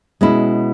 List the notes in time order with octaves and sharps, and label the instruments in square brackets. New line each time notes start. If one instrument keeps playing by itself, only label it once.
[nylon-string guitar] B2 G#3 C#4 E4